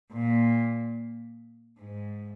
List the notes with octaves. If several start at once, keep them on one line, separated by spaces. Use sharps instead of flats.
A#2
G#2